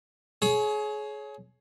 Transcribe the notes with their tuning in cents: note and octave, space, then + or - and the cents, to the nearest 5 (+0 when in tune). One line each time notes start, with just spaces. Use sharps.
G#4 +30 C#5 +0